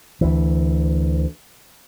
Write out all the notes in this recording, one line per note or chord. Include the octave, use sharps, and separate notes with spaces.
D2 E3